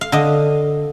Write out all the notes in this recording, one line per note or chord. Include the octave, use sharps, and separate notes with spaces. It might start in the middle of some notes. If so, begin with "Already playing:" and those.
F5
D3 D#5